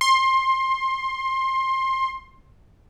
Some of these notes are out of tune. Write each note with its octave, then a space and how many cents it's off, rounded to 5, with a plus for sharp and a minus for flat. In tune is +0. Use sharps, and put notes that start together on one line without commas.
C6 +20